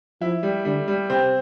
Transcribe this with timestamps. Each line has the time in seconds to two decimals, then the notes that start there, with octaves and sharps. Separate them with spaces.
0.21 F3 E4
0.43 G3
0.65 D3 G3
0.88 G3
1.10 C3 C4